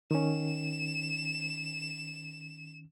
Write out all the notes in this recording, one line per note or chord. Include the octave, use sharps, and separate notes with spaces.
D#3 C#4 E7